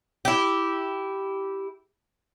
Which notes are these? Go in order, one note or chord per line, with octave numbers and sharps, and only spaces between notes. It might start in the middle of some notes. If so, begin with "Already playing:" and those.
E4 G4